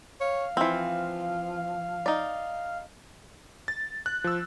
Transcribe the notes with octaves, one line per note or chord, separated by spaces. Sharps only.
C#5 F5
E3 F3 C4
D#4 D5
A6
F#6
F3 E6